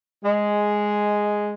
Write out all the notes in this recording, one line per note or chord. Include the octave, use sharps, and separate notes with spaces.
G#3